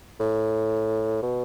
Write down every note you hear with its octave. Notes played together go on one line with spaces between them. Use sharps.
A2
B2